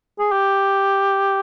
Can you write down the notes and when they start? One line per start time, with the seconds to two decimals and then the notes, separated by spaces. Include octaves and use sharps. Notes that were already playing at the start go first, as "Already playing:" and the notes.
0.19 G#4
0.32 G4